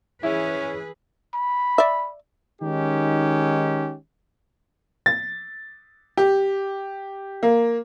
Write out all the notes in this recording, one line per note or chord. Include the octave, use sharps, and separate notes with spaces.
E3 C#4 E4 G#4 B4
B5
D5 E5
D#3 G#3 C#4 D#4 G4
A6
G4
A#3